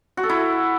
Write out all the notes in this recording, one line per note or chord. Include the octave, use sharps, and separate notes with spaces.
F#4
A4
E4